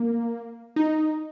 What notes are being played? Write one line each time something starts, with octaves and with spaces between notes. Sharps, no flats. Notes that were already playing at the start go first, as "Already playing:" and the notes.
Already playing: A#3
D#4